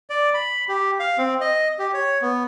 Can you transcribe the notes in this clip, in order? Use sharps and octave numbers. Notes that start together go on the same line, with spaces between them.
D5
B5
G4
F5
C4
D#5
G4
C#5
B3